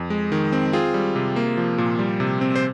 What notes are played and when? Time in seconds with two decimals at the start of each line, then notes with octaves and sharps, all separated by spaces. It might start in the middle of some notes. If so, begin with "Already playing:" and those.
Already playing: F2
0.10 G#3
0.32 D#3
0.52 C4
0.73 C4 F4 G#4
0.94 G3
1.16 C3
1.36 A#3
1.58 F3
1.78 A#2
1.99 G3
2.20 C3
2.41 C4
2.56 C5